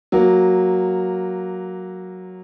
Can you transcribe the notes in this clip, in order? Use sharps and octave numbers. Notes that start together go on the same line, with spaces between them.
F#3 A#3